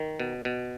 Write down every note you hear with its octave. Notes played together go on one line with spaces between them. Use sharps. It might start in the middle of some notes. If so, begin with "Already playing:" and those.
Already playing: D#3
B2
B2